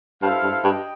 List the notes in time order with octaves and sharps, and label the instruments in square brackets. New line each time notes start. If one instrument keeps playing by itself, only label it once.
[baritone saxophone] G2 [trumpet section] E4 A4 C5 F5
[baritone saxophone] G2
[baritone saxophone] G2 [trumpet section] D#5 G5